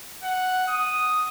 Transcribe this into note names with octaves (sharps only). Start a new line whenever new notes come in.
F#5
D#6